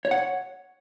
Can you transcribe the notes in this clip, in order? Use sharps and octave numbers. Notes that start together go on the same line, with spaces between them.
C#5
F#5
C#5